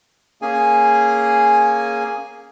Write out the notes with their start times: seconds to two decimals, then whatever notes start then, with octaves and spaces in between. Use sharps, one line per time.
0.42 A#3 C#4 G#4 G#5